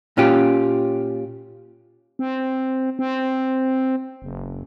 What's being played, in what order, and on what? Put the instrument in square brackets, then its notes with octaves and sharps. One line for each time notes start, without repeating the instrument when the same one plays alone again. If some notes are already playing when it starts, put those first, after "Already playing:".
[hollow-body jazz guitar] A#2 C#4 F4 G4
[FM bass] C4
C4
F#1